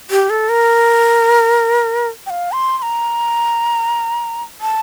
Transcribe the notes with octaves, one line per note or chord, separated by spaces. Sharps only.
G4
A4
A#4
G5
F5
C6
C6
A#5
A5